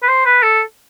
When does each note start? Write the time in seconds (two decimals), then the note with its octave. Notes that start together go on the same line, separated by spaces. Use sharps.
0.03 B4
0.08 C5
0.26 B4
0.43 A4